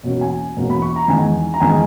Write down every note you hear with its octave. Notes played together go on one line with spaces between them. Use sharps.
E2 B2 A#3 C#4
G#5
E2 B2 A#3 C#4
B5
C#6
A#5
E2 D#3 G#3 G#5
A#5
E2 D#3 G#3 G#5